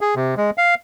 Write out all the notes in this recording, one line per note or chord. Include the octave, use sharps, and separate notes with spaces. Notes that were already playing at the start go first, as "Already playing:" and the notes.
G#4
C3
G#3
F5